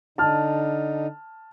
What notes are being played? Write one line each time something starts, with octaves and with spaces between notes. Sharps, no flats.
D3 D#4 A5 F6